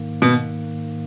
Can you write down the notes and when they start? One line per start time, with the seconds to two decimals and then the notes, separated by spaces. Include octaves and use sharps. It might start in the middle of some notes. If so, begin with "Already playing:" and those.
Already playing: G#2 D#3 A#3
0.22 B2